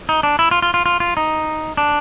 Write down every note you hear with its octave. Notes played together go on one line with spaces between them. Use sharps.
D#4
D4
E4
F4
F4
F4
F4
F4
D#4
D4